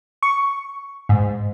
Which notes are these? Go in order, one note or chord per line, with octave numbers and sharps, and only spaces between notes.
C#6
G#2